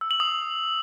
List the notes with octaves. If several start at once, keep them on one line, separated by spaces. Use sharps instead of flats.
E6
F#7
D#6